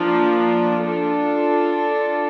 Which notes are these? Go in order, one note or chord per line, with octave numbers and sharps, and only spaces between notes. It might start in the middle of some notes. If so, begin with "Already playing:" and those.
Already playing: F3 A#3 D4 F4
D4 F4 A4